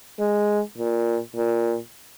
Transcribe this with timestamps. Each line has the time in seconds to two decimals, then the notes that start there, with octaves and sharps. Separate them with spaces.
0.19 G#3
0.78 A#2
1.36 A#2